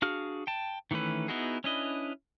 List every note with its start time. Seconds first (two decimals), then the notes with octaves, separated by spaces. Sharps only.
0.02 D4 F#4 G#4 F5 F6
0.47 G5 A5
0.91 D#3 E3 A3 C#4 B4
1.28 B3 D#4 E4 F#4 G#4
1.64 C#4 D4 E4 B4 D#5